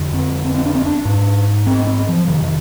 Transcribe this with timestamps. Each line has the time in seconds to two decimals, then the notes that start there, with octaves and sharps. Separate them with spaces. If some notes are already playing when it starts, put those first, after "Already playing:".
Already playing: F2 D3
0.14 C4
0.45 C4
0.55 C4
0.65 D4
0.75 C4
0.86 D4
1.05 G#2
1.67 C4
1.87 C4
2.09 F3
2.28 F2 C3 D#3